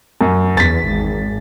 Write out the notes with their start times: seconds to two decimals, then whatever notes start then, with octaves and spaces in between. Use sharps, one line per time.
0.21 F#2
0.57 E2 A6 B6
0.89 G#1